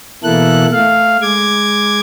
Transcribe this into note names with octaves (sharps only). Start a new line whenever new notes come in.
B2 E3 A#3 E4 A4 F#6
A3 F5
G#3 D6 G#6